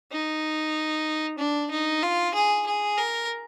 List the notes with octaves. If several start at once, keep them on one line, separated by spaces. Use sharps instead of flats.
D#4
D4
D#4
F4
G#4
G#4
A#4